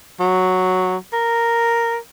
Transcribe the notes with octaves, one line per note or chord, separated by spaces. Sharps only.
F#3
A#4